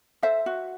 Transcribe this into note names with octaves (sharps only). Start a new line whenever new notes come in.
A4 C5 E5
F#4